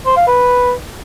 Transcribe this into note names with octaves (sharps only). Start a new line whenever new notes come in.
C5
F5
B4